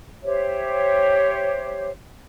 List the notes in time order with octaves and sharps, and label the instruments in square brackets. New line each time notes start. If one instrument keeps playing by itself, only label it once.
[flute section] G4 C5 C#5 E5